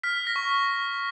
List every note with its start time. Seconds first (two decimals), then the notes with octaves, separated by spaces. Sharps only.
0.03 F6 B6
0.27 A#6
0.36 C#6